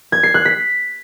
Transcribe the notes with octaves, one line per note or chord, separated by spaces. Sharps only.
G#6
C7
F#6
B6